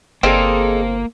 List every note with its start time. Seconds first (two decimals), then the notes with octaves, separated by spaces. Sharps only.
0.23 G1 A#3 C4 D#4 F4 G#4 A4